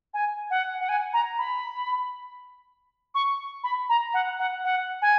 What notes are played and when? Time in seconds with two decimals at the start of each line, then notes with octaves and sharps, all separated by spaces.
0.14 G#5
0.50 F#5
0.80 F#5
0.89 G#5
1.13 A#5
1.38 B5
3.15 C#6
3.64 B5
3.89 A#5
4.14 F#5
4.39 F#5
4.64 F#5
5.02 G#5